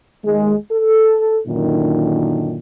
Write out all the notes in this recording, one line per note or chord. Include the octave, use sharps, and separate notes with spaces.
D#2 G#3
A4
F#2 A#2 D3 D#3